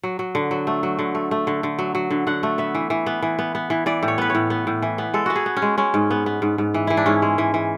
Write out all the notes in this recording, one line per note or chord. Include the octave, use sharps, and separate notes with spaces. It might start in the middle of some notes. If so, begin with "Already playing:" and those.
F#3
F#3
D3
F#3
A3
F#3
D3
A3
A3
D3
D3
F#3
F#3
D3
D3 F#5
A3
B3 E5
E3
E3
B3
E3
B3
B3
E3
E3 D5
A2
C#5
B3 B4
A2 C#5
B3
A2
E3
B3
G#3 A4
B3 F#4
G#4
B3
C#4
G#3
G#3 C#4
G#2
B3
B3
G#2
G#2
E3
E3 E4
D4
G#2 C#4
G#3
E3
E3